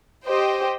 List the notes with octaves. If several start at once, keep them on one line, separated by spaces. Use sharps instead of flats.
G4 C5 D#5 G5